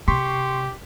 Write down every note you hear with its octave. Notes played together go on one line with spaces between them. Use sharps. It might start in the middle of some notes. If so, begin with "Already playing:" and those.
C3 G4 C6 C#6 B6